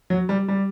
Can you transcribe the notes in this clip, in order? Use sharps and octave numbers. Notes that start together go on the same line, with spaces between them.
F#3
G3
G3